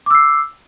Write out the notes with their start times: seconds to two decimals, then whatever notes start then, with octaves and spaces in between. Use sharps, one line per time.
0.06 D6
0.11 E6
0.15 C7